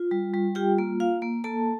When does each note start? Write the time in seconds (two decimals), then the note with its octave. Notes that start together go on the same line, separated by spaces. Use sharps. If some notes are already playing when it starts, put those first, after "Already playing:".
Already playing: F4
0.11 G3
0.34 G3
0.55 F4 G4 G5
0.78 A#3
1.00 F4 F5
1.22 A#3
1.44 A#3 A4 A5